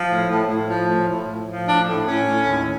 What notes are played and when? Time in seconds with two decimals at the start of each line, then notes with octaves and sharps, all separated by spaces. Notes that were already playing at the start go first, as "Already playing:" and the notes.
Already playing: F3
0.10 A2
0.29 A2
0.49 A2
0.69 F3
0.88 A2
1.08 A2
1.28 A2
1.48 F3
1.68 A2 D4
1.88 A2
2.07 A2 C#4
2.27 A2
2.47 D#2